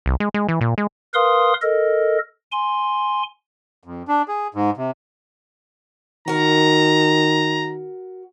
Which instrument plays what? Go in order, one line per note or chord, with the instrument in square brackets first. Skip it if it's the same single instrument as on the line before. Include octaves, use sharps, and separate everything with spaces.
[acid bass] C2
G#3
G#3
E3
A#2
G#3
[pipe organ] A#4 B4 F5 C6 D#6
A4 A#4 D#5
G#5 C6
[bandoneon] F2
D4
G#4
G#2
C3
[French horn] D#3 [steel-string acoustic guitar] F#4 A#4 [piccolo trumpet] A#5